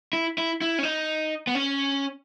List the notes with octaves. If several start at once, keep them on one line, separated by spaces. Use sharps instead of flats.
E4
E4
E4
C#4
D#4
B3
C#4